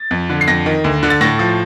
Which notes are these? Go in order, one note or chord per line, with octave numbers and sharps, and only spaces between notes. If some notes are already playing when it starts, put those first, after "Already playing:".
Already playing: A6
F2
D3
C7
F2 A#6
D#3
D2
D3
A6
A2 A#6
F3